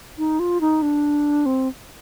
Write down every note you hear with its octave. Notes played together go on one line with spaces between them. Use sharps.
D#4
F4
D#4
D4
C4